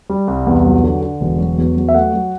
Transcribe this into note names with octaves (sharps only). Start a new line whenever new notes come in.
G3
C2
E2
F#3
D3
D3
E1
F#3
E2
F#3
E5
A3 F#5
F#3